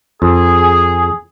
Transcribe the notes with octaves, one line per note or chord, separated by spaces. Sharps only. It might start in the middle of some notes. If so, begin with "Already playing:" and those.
F2 G#4